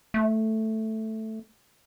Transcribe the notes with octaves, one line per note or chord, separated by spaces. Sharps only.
A3